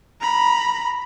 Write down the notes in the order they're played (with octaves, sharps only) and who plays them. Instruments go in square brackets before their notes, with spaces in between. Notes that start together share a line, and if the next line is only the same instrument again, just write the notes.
[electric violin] A#5 B5